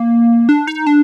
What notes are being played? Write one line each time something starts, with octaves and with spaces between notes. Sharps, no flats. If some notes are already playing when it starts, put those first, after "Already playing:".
Already playing: A#3
D4
D#4
D4